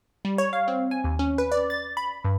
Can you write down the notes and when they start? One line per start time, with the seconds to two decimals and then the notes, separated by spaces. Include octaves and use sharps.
0.25 G3
0.38 C#5
0.53 F5
0.68 C4
0.91 G#5
1.04 D#2
1.19 C#4
1.38 B4
1.52 D5
1.70 A6
1.97 B5
2.24 G2